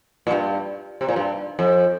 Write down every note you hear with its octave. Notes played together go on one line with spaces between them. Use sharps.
A#2
G2
C3
A#2
G2
F2